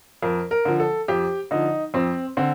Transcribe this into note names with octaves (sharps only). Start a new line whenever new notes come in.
F2 A#4
A#4
D3 F3
A4
F2 G4
D3 F3 D#4
F2 C4
D3 C4